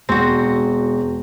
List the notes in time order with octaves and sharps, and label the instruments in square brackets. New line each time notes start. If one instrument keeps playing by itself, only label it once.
[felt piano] E1 [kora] C4 F#4